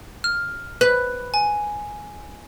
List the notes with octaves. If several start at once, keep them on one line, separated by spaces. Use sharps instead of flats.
F6
B4 F#6
G#5